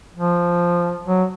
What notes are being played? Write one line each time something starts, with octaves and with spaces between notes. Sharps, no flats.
F3
F#3